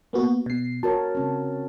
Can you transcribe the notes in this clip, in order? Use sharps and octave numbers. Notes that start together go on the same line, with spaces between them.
A#3 B3 F#4
B2 C7
F#4 A#4 C#5 A5
C#3 C4 C#4